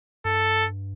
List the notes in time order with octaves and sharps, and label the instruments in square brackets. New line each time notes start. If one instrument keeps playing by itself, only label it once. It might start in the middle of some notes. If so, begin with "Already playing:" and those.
[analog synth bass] G2 [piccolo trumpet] A4